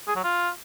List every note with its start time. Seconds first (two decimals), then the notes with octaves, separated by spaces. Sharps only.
0.08 G#4
0.16 F#3
0.24 F4